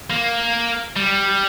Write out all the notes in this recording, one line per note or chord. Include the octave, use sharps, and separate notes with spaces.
A#3
G3